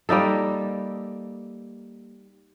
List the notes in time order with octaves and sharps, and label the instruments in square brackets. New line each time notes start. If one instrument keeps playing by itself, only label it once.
[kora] G3 A#3 D#4 A4